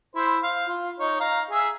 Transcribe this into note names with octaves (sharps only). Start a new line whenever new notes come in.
E4 C5
F5
F4
D#4 C#5
F5 A#5
G#4 E5